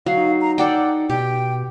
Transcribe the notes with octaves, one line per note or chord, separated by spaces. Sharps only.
F#3 F5
D#4
A#5
A4 D5 F#5 G5
B2 G4 G5